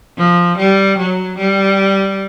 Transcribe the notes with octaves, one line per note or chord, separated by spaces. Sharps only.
F3
G3
F#3
G3